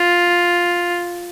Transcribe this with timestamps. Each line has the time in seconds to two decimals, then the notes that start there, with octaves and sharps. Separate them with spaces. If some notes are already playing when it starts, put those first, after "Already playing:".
Already playing: F4